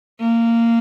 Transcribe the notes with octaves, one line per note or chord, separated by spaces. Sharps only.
A#3